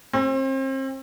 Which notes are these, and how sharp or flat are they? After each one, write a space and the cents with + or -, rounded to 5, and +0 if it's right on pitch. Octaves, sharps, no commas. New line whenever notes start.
C4 +35